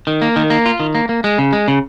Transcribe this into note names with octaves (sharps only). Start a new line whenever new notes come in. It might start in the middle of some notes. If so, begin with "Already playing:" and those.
D#3
A#3
D#3
A#3
F4
D#3
A#3
A#3
G#3
C#3
G#3
C#3